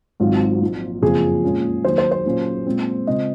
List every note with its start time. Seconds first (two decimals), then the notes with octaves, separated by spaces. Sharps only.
0.20 G#1 G#2 F#3 C4 D#4 F4
0.40 F4
0.61 A#1 A#2 F3
1.02 F#1 F2 C#3 F3 C4 G#4
1.43 A#2 G#3 C#4 F4
1.84 D#2 D#3 F#3 C5
1.98 C5
2.11 C5
2.26 A#2 F#3 C#4 F4
2.67 A#2 G#3 C4
3.07 C#3 G#3 C4 F4 D#5